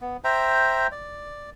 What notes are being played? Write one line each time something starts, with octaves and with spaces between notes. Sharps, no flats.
B3
C5 E5 G5 A#5
D5